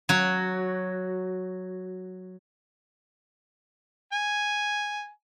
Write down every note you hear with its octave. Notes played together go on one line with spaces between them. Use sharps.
F#3 F#4
G#5